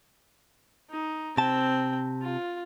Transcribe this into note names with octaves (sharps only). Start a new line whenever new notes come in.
D#4
C3 C4 G5 A5
F4